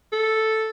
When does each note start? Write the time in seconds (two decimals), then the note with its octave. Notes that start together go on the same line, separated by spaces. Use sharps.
0.12 A4